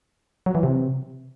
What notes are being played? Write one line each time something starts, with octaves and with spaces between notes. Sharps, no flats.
F#3
E3
C3